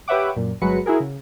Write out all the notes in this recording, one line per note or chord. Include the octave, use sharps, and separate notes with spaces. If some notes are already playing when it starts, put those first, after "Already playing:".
G4 B4 C#5 E5 F#5 D6
F#2 A#2
G1 F#3 G#3 F#4 B4 C#7
E4 F#4 G#4 A#4
C#3